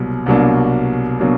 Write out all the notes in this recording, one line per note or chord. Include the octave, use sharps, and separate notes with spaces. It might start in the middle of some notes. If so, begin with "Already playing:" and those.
Already playing: C2 B2 F#3 A#3
C2 B2 F#3 A#3 D4
B2 F#3 A#3 D4